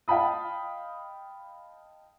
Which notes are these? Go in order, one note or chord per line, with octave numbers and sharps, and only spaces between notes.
D#5 F5 G5 A5 B5 D#6